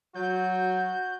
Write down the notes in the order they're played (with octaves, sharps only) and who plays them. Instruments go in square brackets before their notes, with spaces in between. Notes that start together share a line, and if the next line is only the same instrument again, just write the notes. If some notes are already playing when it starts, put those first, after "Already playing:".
[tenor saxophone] F#3 [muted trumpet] F#4 [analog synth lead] G6